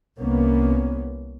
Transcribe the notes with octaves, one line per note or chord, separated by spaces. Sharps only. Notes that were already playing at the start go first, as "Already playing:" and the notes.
C2 A#3 B3 C#4